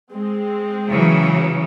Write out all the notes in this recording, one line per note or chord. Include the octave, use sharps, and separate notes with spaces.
G#3 C4
C#3 E3 F#3